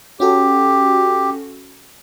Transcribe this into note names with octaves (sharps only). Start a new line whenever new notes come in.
C#4 F#4 G4 A4